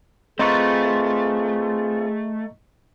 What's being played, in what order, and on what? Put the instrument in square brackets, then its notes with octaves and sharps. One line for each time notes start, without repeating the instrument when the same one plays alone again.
[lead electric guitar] A3 [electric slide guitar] C4 F4 B4 [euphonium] G#4 [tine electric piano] D#5 A#5 C#6